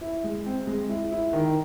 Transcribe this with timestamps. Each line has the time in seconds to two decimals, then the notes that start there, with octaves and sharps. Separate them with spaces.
0.01 E4
0.24 G#3
0.46 C4
0.67 G#3
0.89 E4
1.12 E4
1.33 D#3